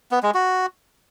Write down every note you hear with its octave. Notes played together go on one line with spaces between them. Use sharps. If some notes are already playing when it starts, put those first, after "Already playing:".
B3
G#3
F#4